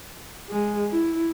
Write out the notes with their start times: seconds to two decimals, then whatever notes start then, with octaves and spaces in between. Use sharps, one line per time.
0.50 G#3
0.91 E4